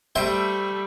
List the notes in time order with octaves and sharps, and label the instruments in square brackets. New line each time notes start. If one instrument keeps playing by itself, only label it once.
[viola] G3 A3 [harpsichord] C5 E5 G5